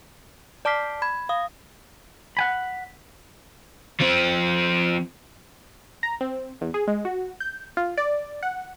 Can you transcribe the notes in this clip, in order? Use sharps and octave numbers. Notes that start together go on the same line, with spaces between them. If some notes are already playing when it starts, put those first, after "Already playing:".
D5 A5 D6 F6 B6 C7
B5 G#6
F5 D#6
F#5 G#5 B5
F3 C4
A#5
C4
E2
G#4
G#3
F#4
G6
F4
D5
F#5